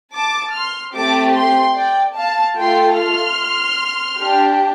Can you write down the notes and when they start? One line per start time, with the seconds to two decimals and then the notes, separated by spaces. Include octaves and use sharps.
0.15 A5 D6
0.55 C6 F6
0.95 A3 C4 G4 A5 D6
1.36 G5 C6
1.76 D5 G5
2.16 F5 A5
2.57 A3 F4 A4 G5 C6
2.97 C6 F6
4.19 D4 G4